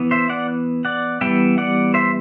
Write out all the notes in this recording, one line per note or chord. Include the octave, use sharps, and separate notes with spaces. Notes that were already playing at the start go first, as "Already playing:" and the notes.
Already playing: E3 B3
C5 E5
D5 F#5
D5 F#5
E3 G3 B3 E5 G5
D5 F#5
C5 E5